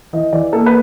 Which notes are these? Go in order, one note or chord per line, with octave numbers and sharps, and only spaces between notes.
E3 D#5
E3 D5
A#3 A4
B4